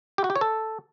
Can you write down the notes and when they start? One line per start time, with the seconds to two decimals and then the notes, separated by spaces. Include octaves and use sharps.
0.18 G4
0.24 F#4
0.30 G4
0.36 C#5
0.41 A4